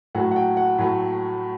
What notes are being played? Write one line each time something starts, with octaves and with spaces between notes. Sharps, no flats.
A2 F#3 A3 F#5
F#5
G5
F#5
A2 F#3 A3